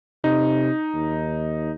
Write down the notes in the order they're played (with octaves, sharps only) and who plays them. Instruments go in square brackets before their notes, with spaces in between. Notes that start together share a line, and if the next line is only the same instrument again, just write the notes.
[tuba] C3 [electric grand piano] D#4
[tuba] D#2